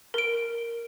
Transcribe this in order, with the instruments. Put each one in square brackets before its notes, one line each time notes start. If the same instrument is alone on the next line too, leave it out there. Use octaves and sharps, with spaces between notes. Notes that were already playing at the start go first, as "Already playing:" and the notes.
[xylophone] A#4 D7